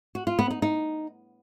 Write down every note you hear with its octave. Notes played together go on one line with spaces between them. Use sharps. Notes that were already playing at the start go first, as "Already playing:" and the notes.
F#4
F4
B3
D#4
D#4